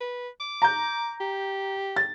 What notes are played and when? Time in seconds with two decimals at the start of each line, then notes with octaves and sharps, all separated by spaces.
0.01 B4
0.40 D6
0.62 A#5 G6
1.20 G4
1.96 A6